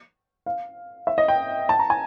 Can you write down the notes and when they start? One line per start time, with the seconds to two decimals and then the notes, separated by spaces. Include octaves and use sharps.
0.46 F5
1.07 E5
1.18 D#5
1.28 G5
1.69 A5
1.79 A#5
1.90 G#5